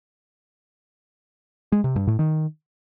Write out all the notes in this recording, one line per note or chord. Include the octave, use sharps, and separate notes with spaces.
G#3
C3
G2
A2
D#3